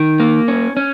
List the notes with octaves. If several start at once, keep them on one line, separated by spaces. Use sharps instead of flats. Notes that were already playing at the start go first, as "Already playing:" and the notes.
Already playing: D#3
A#3
C#4
C#4